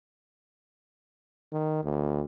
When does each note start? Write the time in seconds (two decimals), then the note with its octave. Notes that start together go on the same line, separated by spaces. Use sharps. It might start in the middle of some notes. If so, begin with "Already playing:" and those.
1.52 D#3
1.84 D2